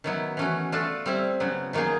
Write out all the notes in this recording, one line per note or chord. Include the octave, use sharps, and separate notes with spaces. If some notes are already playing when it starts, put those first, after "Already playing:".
D#3 F#3 B3 E4
E3 A3 C#4 F#4
A3 D4 F4 A4
G3 C4 E4
C#3 F#3 B3
D#3 F#3 A#3 D#4 G#4